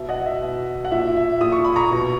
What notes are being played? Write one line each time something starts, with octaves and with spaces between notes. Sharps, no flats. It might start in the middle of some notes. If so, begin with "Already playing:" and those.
Already playing: B2 E5
D#5 F#5
E5
B2
F#5
A#2 E5
E5
A#2 D#6
C#6
B5
A#5 C#6
B2